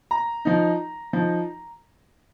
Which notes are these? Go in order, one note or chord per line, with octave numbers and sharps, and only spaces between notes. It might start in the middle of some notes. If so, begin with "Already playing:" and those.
A#5
F3 D#4
F3 D#4